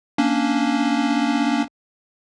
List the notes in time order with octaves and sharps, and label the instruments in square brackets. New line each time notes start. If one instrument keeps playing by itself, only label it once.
[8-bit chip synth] A#3 C#4 D4